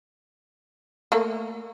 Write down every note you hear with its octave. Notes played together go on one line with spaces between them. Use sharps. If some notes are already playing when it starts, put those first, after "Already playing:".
A3 A#3